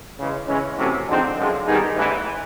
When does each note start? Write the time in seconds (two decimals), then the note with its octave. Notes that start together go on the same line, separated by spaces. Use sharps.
0.19 C#3 E3 G#3
0.48 C#3 E3 G#3 C#4
0.77 C3 E3 A3 C#4 F#4
1.07 D3 F3 G#3 C4 D#4
1.36 F#2 D3 F3 G#3
1.66 D#3 G3 B3 D#4 G#4
1.96 A1 G#2 E3